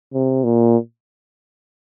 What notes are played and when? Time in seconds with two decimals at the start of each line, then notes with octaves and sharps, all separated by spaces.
0.13 C3
0.44 A#2